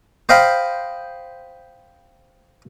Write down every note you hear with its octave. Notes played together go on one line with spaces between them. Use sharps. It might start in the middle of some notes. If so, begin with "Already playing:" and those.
C5 D#5 F5 G5 B5